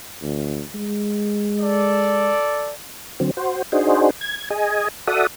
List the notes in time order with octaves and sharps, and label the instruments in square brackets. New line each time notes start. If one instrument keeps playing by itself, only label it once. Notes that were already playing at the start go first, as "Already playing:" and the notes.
[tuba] D2
G#3
[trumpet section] A4 D5
[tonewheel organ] D3 F#3 C4
F#4 C5
D4 D#4 F#4 G#4 C5
G#6
G#4 D#5 G#5
F#4 A4 D5 E5 F#5 D#6